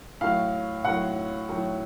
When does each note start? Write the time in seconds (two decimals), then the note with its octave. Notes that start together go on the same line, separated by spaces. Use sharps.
0.21 A2 F#3 F5
0.85 A2 F#3 F#5
1.49 A2 F#3